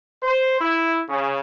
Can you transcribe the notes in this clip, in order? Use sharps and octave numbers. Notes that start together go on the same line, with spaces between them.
C5
E4
C#3